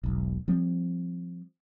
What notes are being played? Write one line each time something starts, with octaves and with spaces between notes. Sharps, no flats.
E1 B1
F3 G3 C4